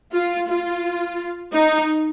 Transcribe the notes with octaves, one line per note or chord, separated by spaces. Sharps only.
F4
F4
D#4